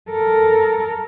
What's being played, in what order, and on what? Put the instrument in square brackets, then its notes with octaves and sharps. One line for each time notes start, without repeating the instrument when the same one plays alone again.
[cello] A4 A#4